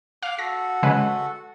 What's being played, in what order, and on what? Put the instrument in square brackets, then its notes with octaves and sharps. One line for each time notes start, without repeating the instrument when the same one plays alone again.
[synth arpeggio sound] F5 [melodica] D6
[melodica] F#4 A4 F#5 [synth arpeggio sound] A#6
[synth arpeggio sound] C#3 G#3 B4